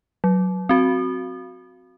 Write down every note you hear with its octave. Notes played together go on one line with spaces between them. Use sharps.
F#3
C4 F#4